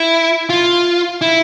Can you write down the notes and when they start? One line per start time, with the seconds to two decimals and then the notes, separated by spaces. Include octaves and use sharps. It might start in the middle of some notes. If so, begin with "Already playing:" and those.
Already playing: E4
0.50 F4
1.21 E4